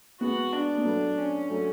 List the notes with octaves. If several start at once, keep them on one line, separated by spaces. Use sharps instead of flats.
G#3 B3 F#4
D4
B3
F#3 A3
C#4
F#3 A3